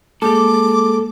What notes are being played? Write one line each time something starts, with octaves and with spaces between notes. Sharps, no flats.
G#3 A#3 G#4 A4 D6